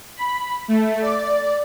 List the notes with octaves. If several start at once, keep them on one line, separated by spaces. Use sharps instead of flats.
B5
A3
D5